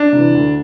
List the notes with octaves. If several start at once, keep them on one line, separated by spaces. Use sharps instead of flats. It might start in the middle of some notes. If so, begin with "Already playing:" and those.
Already playing: D4
C3 E3
D2